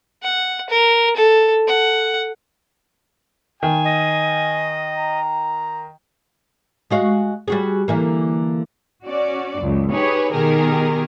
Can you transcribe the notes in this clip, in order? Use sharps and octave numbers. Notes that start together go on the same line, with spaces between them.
F#5
A#4
A4
F#5
D#3 G#5
D#5
A#5
G#3 F#4 F5
G3 F#4 G#4
D3 E3 A#3
C#4 F#4 D5
C#2 F#2
D#4 G4 G#4 B4 C#5
B2 D#3 G4 G#4 A#4